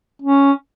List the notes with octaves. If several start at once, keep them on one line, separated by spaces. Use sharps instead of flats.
C#4